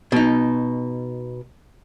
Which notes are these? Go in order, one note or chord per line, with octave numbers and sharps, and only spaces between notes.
B2 D#4